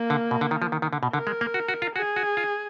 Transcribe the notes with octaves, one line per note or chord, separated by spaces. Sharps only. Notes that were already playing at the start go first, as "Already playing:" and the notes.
Already playing: A#3
D3
B2
D3
D#3
F3
D#3
D#3
D3
B2
D3 A#4
G#3
A#3
F#4
F#4
F4
F#4 G#4
F#4
F4